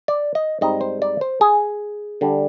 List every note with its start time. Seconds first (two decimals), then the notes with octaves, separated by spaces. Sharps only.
0.08 D5
0.35 D#5
0.61 G#2 G3 C4 D#4 D#5
0.81 C5
1.02 D5
1.21 C5
1.41 G#4
2.21 D3 G3 D4